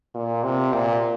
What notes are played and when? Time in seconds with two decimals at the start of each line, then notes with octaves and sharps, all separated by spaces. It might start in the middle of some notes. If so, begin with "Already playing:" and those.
0.15 A#2
0.44 C3
0.73 A#2